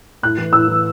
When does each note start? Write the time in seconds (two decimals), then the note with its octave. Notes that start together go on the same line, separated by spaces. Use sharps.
0.23 A2 F#6
0.38 E3
0.53 A2 E6
0.68 E3